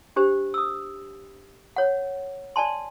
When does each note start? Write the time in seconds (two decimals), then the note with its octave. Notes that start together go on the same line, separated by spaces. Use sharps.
0.16 D4 G4 C5
0.54 D#6 E6
1.76 C#5 F#5
2.56 D5 G#5 A5 C6